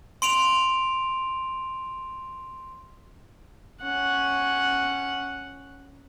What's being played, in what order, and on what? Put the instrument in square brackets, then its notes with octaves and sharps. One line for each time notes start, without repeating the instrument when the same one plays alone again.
[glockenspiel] C6 D7 F7
[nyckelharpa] C#4 F#5